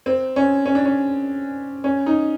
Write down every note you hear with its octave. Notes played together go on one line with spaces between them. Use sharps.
C4
C#4
C#4
D4
C#4
C#4
D#4